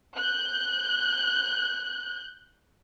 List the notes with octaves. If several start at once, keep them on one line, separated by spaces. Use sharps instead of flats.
F#6 G6